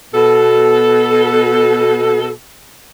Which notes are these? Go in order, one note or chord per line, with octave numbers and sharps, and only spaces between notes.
B2 A4